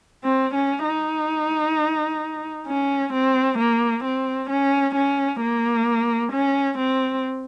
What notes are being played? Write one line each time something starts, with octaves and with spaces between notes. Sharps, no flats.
C4
C#4
D#4
C#4
C4
A#3
C4
C#4
C#4
A#3
C#4
C4